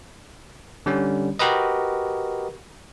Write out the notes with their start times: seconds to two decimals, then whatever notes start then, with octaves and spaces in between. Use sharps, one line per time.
0.86 D3 G3 C#4
1.39 F#4 G4 A#4 B4 D#5